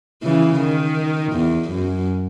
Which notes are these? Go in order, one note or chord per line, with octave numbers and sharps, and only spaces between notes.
C#3 E3
D#3
E2
F#2